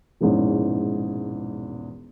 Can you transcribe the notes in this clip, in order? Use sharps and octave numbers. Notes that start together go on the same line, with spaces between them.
E1 A#1 E2 G#2 C#4